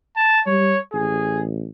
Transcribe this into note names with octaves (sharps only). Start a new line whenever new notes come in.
A5
G3 C#5
A1 G#4